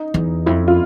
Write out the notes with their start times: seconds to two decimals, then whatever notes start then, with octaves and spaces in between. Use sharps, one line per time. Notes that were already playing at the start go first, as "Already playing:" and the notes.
Already playing: D#4
0.14 E2
0.46 F2 E4
0.68 F4